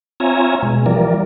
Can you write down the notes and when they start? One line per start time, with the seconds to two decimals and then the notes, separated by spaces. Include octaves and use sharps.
0.20 C4 F4 C#5 E5 G#5 A#5
0.63 B2 G#3
0.86 E3 F3 G3 A#4 D5